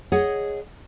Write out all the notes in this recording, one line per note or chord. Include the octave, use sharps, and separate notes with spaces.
G#4 C#5 D#5 F#5